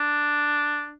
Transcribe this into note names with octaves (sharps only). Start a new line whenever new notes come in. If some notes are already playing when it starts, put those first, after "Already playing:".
Already playing: D4